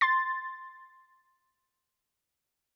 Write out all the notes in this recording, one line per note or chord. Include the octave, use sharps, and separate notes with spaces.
C6 A6